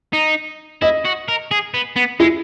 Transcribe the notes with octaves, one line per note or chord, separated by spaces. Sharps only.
D#4
E4 D#5
F#4
A#4
G#4
B3
B3
G#3 E4